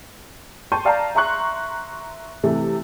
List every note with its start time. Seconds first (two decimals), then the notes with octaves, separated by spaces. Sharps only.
0.72 G5 A5 C6 C#6 G6 D#7
0.85 D5 F5 A5 A#5
1.15 E5 A#5 C6 C#6 F#6
2.43 C3 E3 A3